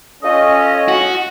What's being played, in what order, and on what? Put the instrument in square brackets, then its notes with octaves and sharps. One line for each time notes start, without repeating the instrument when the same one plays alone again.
[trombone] C#4 [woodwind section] F4 A4 D#5
[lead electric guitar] F#4